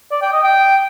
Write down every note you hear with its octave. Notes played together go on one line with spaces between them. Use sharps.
D5
G5
D#5
G5